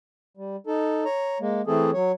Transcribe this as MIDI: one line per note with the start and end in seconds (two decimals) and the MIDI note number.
0.37 0.56 55
0.67 1.04 63
0.67 1.04 69
1.05 1.38 73
1.05 1.38 82
1.41 1.61 56
1.41 1.61 58
1.67 1.91 52
1.67 1.91 57
1.67 1.91 60
1.67 1.91 68
1.67 1.91 69
1.93 2.12 54
1.93 2.12 73